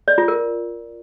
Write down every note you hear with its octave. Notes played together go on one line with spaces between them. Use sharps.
D5
F4
A#4